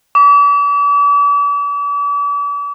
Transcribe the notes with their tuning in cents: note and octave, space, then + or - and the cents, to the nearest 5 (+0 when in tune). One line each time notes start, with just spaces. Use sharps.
D6 -40